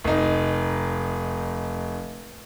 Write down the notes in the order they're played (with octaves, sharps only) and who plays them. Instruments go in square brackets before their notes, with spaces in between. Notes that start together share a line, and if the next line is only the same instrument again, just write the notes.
[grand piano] F1 D#4